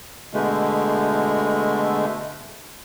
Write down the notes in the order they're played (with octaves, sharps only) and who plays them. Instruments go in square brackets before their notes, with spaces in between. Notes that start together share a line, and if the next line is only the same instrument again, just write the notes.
[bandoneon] B2 D3 G#3 A3